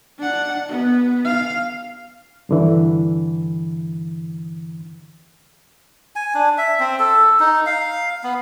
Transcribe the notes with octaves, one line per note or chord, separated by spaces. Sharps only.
D4 F#5
B3
F5
G2 D3 E3
G#5
D4
E5
C4
A4
D#4
F5
B3